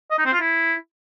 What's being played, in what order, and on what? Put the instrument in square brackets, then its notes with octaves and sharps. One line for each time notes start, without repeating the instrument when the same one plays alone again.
[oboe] D#5
D#4
C4
F4
E4